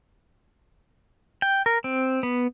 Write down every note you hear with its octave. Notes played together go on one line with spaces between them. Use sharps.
G5
A#4
C4
B3